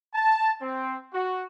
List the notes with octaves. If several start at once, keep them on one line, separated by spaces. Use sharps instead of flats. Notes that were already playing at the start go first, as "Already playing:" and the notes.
A5
C4
F#4